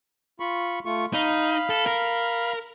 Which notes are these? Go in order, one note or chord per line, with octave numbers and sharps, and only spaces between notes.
F4 B5 C#6
A3 F4 C#6
D#4 F5 B5
A4
A#4